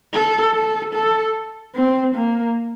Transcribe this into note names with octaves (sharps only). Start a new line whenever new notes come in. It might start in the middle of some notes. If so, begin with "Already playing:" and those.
A4
A4
A4
C4
A#3